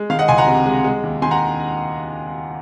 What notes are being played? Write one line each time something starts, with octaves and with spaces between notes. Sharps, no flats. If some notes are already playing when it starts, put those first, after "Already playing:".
Already playing: G#3
D#3 F5
D#5 F#5
C#2 G#5 C6
F#5 A#5
C3
G#3
G#3
D#2
D#3 G#5 C6
F#5 A#5